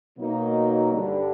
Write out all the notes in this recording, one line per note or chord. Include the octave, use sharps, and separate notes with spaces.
B2 F#3 A#3 D#4
G2 D3 G3